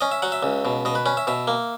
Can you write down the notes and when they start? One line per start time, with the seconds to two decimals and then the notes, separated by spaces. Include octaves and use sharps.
0.01 C#4 D#5
0.11 E5
0.22 F#3 F#5
0.32 E5
0.43 C#2
0.65 B2
0.85 B2 D#5
0.95 B4
1.06 C#4 B4
1.17 E5
1.27 B2 E5
1.47 A#3